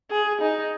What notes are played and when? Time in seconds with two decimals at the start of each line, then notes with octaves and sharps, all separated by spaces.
0.11 G#4
0.41 D#4